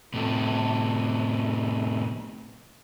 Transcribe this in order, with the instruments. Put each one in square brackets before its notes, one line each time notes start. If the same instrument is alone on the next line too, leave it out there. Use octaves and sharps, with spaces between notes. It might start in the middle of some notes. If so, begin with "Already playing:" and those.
[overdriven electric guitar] A2 C3